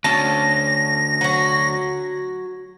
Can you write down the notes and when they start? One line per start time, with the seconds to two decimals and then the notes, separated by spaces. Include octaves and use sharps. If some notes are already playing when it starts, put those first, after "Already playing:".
0.04 D2 C#4 A5 A#6
1.21 F#3 F#4